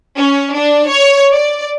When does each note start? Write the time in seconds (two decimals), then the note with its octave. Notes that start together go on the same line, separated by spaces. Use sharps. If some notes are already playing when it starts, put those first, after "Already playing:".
0.18 C#4
0.53 D4
0.89 C#5
1.34 D5